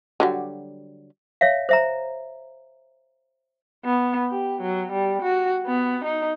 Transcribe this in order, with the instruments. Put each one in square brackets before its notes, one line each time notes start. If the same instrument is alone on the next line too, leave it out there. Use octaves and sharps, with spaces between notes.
[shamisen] D3 F#3 G3
[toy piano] C#5 E5 F5
C5 E5 A#5
[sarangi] B3
G4
F#3
G3
F#4
B3
D#4